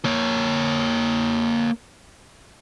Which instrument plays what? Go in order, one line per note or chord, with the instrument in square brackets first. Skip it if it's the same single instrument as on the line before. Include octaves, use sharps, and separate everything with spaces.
[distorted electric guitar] A#3 C#5